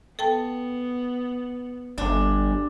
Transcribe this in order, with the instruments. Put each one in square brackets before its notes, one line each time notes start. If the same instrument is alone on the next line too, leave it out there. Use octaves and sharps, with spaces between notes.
[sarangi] B3 [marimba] A4 G5 A5
[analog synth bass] G1 [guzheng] D4